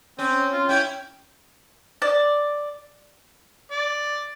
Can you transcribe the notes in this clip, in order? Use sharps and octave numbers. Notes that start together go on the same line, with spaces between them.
C4 C#4
F4
C#4 E4 C#5 G5
D5
D5